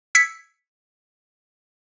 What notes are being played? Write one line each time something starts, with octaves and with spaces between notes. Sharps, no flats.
E6 G#6 B6 C#7